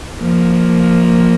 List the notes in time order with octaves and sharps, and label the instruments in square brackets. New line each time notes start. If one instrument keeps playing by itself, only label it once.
[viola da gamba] F3 A#3